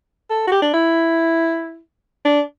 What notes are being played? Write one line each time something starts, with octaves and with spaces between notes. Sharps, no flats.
A4
F#4
G4
D4
E4
D4